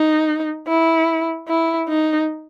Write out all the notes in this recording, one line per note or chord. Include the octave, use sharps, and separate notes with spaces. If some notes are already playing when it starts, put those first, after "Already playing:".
Already playing: D#4
E4
E4
D#4